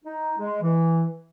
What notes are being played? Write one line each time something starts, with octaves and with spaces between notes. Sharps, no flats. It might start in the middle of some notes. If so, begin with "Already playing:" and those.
D#4
G#3
E3